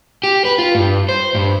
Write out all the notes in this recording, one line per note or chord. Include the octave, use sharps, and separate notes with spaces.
G4
B4
F4
G2
C5
G2